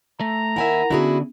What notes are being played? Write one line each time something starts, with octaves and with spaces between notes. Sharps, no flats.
A3 A#5
D#2 E4 A#4 E5 F#5 G#5
D3 B3 C#4 E4 F#4 G#4